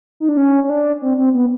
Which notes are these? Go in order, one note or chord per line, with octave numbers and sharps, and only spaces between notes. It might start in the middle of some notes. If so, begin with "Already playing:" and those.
D#4
D4
C#4
C#4
D4
C4
C4
B3